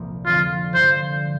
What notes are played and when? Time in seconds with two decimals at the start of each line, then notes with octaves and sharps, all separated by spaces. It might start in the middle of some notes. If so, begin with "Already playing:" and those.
Already playing: G1 C2 G2 A#2 F3 A#3
0.26 F2 D3 F3 C4 F4
0.74 G2 D3 F3 C5